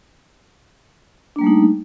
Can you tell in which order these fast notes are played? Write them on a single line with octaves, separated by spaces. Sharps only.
D4 A#3 G3 A3 D#4